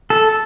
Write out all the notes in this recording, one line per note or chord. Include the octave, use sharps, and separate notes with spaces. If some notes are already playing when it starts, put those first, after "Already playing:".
A4